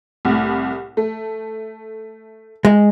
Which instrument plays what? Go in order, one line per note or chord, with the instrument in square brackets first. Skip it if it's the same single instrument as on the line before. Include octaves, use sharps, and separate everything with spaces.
[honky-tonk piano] C2 A2
A3
[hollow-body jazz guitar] G#3